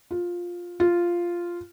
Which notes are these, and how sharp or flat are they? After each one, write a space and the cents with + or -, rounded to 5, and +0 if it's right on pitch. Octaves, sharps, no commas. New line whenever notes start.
F4 +10
F4 -5